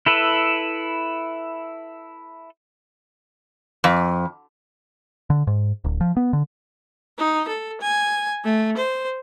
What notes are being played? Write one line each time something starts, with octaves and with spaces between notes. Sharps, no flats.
E4 A4 B4
F2
D3
G#2
D1
F3
B3
D3
D#4
A4
G#5
A3
C5